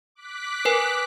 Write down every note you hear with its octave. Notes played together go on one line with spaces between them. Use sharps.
D6 F#6 B6
A#4 B4 G#5